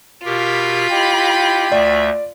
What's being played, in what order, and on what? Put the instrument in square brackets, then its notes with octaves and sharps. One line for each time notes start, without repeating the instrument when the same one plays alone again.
[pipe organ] B2 G4 A#4 [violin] F4 B5
[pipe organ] E4 G4 D#5 [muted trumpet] G5
[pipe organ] D2 A3 E5 [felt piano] D5